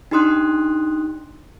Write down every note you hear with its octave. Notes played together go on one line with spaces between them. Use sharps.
D4 D#4 G4 C6 D#6 F#6